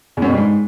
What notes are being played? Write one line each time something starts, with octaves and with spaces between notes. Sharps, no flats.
E2
F#2
B2
G2
G#2